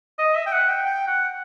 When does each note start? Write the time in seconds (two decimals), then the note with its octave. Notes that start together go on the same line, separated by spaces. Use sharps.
0.19 D#5
0.35 E5
0.47 G5
0.52 F#5
0.69 G5
0.85 G5
1.07 F#5